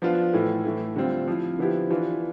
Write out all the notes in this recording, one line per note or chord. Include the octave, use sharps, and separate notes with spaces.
F3 B3 D4 F4
A2 E3 A3
A2 E3 A3
D3 G3 C4 F4
F3 C4 E4
D3 F3 B3 E4 G4
E3 B3 D4 F4